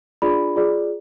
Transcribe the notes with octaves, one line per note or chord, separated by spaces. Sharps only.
D4 F4 G#4 D5 B5
F4 G#4 D5